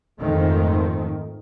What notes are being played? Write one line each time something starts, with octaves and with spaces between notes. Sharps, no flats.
F2 G#2 D#3 A3